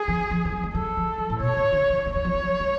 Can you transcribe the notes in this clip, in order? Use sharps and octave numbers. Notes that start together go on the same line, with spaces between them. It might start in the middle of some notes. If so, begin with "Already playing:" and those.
Already playing: G#4
F3
F3
F3
F#3
G#3
F#3 A4
F3
F#3
A2
B2 C#5
C#3
D3
F3
G#3 C#5
F#3
F3
F#3
G#3